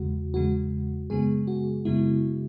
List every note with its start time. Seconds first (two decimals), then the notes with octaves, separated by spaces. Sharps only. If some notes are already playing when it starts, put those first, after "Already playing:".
Already playing: E2 C#3 G#3 F#4
0.34 E2 C#3 G#3 F#4
1.10 F#2 C#3 G#3 B3 G#4
1.47 F#4
1.85 F#2 C#3 G#3 B3 E4